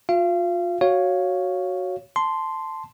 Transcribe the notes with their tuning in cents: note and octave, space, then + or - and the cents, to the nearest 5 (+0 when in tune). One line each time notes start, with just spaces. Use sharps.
F4 +30 F5 -35
F#4 +0 C#5 +0 F5 +0
A5 +0 C6 -5